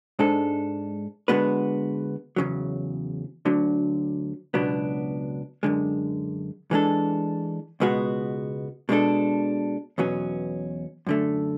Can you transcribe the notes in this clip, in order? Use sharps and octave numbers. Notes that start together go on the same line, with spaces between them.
G#2 G#3 D4 A4
D3 G#3 B3 F#4 B4
E2 C#3 F#3
D2 D3 F#3
C#2 B2 F#3 B3 D4
F#2 D3 G#3
E3 G#3 D4 A4
C#2 B2 G#3 B3 F#4
B2 G#3 D4 A4
E2 B2 F#3 C#4
F#2 D3 A3